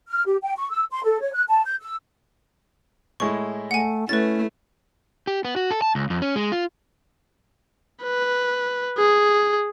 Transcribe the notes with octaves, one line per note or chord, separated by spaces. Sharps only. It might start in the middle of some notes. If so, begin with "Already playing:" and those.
F6
G4
G5
C#6
E6
C6
A4
C#5
F#6
A5
G6
E6
A2 G#3 E4 C#6
A3 F#5 G#5
A3 C#4 E4 B4 A6
G4
B3
F#4
A4
A5
C#2
F2
C#4
G#3
F4
B4
G#4